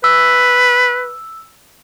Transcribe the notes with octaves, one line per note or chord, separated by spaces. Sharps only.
B4 E6